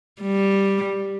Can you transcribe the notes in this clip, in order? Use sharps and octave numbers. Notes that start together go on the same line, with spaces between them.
G3